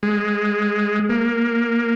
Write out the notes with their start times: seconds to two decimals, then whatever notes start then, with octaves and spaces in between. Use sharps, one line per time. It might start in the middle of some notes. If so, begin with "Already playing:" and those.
0.03 G#3
1.09 A#3